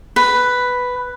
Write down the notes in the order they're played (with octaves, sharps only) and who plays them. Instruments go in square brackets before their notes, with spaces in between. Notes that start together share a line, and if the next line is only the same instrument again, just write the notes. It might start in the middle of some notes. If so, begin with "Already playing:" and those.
[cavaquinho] B4